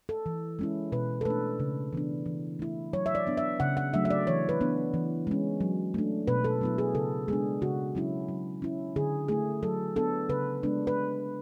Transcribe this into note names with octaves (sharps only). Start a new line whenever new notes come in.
A4
E3
G#3 C#4 E4
B2 B4
A4
A3 D4 B4
C#3
E3 B3 D4
E3
A3 E4
F#3 C#5
E5
D5
B3 D4
E5
C#3 F#5
F#5
F#3 A3 D4 E5
E5
D5
E3 C#5
B4
B3 D4
E3
G#3 C#4
F#3
A3 D4
B2 B4
A4
F#3 B3 E4
G#4
C#3 A4
G#3 B3 D4 G#4
C#3 F#4
F#3 C#4 E4
F#3
C#4 E4
D3 G#4
A3 E4 G#4
F#3 A4
B3 D4 A4
C#3 B4
G#3 B3 D4
B4